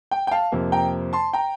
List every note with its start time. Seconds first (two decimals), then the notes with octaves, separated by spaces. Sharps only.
0.11 G5
0.27 G5
0.31 F5 A5
0.52 F2 C3 F3 A#3
0.72 G5 A#5
1.13 A5 C6
1.33 G5 A#5